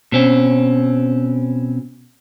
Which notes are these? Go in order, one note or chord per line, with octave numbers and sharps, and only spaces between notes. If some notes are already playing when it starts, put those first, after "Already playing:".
B2 C4 C#4